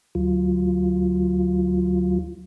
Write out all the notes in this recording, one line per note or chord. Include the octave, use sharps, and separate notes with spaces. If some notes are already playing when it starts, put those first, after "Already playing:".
D2 F#3 F4